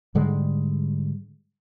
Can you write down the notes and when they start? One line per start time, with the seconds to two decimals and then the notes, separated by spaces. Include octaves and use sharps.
0.15 G#2 D3 G3 G#3